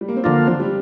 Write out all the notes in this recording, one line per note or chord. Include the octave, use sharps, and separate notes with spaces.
G3
A#3
C4
D3 F3 A#3 D4 F4
C4
G3